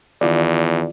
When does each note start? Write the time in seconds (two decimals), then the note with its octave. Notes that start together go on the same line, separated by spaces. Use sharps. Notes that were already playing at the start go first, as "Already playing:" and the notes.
0.21 E2 D#3 F4 D5